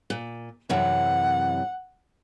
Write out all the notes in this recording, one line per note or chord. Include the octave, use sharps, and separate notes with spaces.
A#2
F#2 C3 E3 F#5